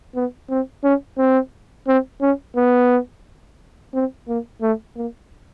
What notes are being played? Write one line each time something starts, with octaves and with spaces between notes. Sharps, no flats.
B3
C4
C#4
C4
C4
C#4
B3
C4
A#3
A3
A#3